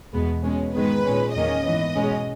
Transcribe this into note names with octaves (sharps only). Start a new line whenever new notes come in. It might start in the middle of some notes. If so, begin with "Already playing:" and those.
E2 B2 G#3 B3
B2 G#3 C#4
G#2 D#3 G#3 B3 B4
A#2 G#3 C#4
E2 D#3 A#3 C#4 D#5
G#2 E3 B3
B2 G#3 C#4